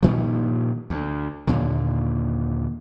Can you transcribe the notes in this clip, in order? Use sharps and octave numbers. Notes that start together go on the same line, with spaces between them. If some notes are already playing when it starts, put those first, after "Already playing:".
G2 A#2 D#3 F3
D2
D#2 A#2 D3